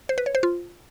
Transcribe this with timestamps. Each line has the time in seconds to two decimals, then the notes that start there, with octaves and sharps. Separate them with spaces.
0.09 C5
0.18 B4
0.26 C#5
0.35 C5
0.43 F4